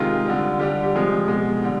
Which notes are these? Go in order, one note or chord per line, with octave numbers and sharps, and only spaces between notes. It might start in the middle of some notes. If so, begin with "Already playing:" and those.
Already playing: C3 D#3 G#3 F4
D3 G3
D3 G3 G4
G4
C3 F3 G#3
B2 G#3
D3 G3